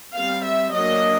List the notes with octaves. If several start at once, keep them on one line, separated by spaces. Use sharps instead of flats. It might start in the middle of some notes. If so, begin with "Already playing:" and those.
G3 C4 F5
E5
F#3 A#3 D4 D#5